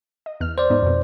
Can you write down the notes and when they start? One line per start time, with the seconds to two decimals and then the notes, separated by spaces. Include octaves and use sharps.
0.26 D#5
0.40 E2 F6
0.58 C5 D5
0.70 G#2 B3 D#4
0.82 F2 B2